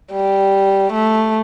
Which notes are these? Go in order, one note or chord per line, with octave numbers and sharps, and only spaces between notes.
G3
A3